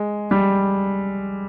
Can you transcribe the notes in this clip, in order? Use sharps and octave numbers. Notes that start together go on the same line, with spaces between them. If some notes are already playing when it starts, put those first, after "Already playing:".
Already playing: G#3
G3